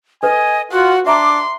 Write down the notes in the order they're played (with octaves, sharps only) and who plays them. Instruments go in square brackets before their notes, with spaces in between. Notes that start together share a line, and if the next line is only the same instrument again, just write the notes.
[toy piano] A4 B4 [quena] D#5 [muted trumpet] G#5
[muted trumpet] F4 [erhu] F#4 [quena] F#5
[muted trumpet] D4 [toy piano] E5 A#5 [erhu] C6 [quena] D6